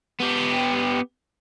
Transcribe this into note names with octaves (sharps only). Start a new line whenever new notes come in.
B3 G4